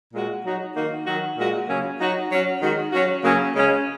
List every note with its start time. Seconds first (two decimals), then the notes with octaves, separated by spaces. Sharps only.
0.13 A#2 G#3 F#4
0.44 F#3 D#4 F#4
0.75 D#3 A#3 D#4 F#4
1.06 D#3 F#3 D#4 F#4
1.37 A#2 G#3 F#4
1.68 C#3 F#3 A#3 C#4
1.99 F#3 D#4 F#4
2.30 F#3 C#4 F#4
2.61 D#3 G#3 F#4
2.92 F#3 C#4 F#4
3.24 C#3 F#3 A#3 C#4
3.55 C#3 G#3 C#4